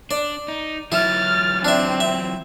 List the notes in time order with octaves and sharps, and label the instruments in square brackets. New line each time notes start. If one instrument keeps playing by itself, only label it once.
[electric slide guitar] D4 [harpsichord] D5
[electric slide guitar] D#4
[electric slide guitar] E3 F#3 [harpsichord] E4 [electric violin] F6 A6
[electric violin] C4 [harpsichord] D4 E5
[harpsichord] E5